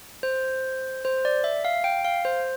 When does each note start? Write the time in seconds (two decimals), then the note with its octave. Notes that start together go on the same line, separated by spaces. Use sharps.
0.23 C5
1.05 C5
1.25 D5
1.44 E5
1.65 F5
1.84 G5
2.05 F5
2.25 C5